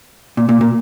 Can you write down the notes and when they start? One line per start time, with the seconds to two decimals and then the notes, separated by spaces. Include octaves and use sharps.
0.37 A#2
0.49 A#2
0.61 A#2